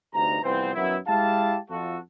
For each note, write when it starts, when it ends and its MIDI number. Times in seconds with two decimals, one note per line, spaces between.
0.14 0.38 38
0.14 0.38 43
0.14 0.38 48
0.14 0.38 63
0.14 0.38 82
0.43 0.71 36
0.43 0.71 52
0.43 0.71 53
0.43 0.71 59
0.43 0.71 60
0.43 0.71 72
0.74 0.96 42
0.74 0.96 51
0.74 0.96 54
0.74 0.96 59
0.74 0.96 64
1.07 1.57 56
1.07 1.57 64
1.07 1.57 67
1.07 1.57 77
1.07 1.57 81
1.69 1.97 41
1.69 1.97 65
1.69 1.97 66
1.69 1.97 69